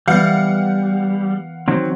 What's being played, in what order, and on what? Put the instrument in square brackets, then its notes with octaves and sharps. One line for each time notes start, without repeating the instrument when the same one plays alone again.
[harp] E3 B3 [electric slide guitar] G3 [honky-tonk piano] F5 F#5
[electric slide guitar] D#3 F#3 C4